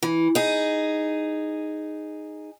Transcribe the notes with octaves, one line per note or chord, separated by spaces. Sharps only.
E3
D#4 G#4